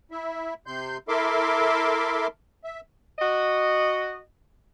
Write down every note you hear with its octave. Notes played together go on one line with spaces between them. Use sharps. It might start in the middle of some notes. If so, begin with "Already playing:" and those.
E4 E5
C3 C6 G6
E4 A4 A#4 E5 C6 D6
E5
F#4 D#5